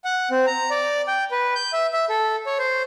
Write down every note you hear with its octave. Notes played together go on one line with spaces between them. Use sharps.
F#5
C4
A#5
D5
G5
B4
G6
E5
E5
A4
C#5
C5